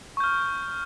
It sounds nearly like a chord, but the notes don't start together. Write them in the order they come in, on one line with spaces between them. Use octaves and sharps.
C#6 G6 F6